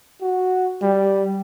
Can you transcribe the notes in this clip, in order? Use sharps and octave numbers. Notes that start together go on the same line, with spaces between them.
F#4
G3